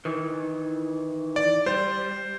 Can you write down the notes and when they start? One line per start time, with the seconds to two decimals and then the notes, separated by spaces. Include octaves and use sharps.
0.05 D#3 E3
1.36 D5
1.66 G3 C5